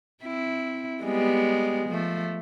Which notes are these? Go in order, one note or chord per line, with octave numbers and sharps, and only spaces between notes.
C4 E4
G3 G#3 B3
F3 A3